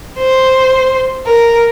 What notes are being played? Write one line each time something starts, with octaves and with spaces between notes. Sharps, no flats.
C5
A#4